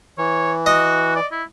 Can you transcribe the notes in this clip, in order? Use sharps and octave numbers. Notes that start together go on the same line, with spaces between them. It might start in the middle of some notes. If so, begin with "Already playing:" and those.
E3 C#5
F#4 D#5
D5
E4